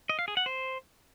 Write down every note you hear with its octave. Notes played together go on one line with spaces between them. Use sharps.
D#5
F5
G#4
F#5
C5